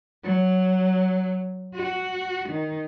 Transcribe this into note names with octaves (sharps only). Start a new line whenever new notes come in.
F#3
F#4
D#3